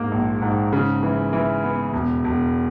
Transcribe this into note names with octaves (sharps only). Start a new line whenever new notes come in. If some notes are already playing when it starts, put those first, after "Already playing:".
Already playing: G#2 A#3
A#1
G#2
C#3
E3
E3
B3
E1
E1